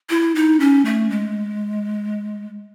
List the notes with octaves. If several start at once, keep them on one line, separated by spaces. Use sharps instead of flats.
E4
D#4
C#4
A3
G#3